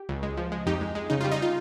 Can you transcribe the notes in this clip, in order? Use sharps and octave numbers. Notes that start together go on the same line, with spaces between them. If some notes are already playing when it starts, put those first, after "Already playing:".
Already playing: G4
C#2
G#3
F3
G#3
F2 D#4 G4
G#3
G#3
C#3 D#4
F4
G3
D#4
F4